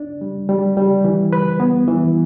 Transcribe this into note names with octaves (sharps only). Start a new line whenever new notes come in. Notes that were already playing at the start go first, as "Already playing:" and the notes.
Already playing: D4
G3
G3
G3
E3
B4
B3
E3